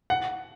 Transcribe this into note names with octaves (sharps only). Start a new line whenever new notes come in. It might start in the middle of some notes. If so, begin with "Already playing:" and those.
F#5